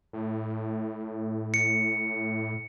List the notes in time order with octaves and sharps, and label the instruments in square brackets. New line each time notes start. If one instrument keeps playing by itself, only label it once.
[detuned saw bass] A2
[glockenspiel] C#7